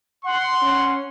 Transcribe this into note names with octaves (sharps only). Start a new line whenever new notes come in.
F#5 C6
C#4 F#5